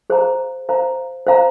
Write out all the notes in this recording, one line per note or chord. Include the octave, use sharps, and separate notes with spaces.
G#4 C5 F5 A#5
C5 F5 A#5
C5 F5 A#5